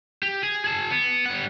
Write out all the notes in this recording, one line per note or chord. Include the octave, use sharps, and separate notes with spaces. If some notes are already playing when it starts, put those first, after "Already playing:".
G4
G#4
G#4 A5
B3
G3 F#5